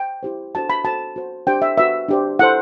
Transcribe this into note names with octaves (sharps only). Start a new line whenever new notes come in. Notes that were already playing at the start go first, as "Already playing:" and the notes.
Already playing: G5
E4 G4 C5
D4 F#4 A4 C5 A5
B5
F#4 A4 C5 A5
F#4 C5
D4 G4 C5 G5
E5
F#4 B4 E5
D4 G4 C5
E4 A4 C5 F#5